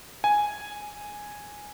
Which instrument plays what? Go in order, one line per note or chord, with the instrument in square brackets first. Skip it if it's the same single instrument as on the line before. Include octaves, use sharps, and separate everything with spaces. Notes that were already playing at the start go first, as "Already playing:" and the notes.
[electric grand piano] G#5